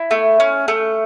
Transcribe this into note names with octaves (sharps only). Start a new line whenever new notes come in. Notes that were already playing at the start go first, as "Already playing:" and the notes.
Already playing: E4
A3
C#4
A3